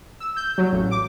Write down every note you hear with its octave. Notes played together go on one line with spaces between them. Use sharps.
E6
G6
F#3
A1
D6